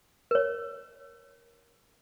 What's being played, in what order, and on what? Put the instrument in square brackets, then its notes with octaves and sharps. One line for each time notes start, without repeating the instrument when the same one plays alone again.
[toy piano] A#4 C#5